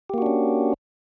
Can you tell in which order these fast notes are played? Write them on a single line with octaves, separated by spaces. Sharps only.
G4 A#3 F#4 D4 C#4